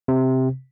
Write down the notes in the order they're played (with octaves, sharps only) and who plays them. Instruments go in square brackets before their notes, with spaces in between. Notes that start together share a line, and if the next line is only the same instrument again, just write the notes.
[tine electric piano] C3